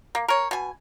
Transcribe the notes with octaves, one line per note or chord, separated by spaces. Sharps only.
A#3
A#4 C#5
B2 G#5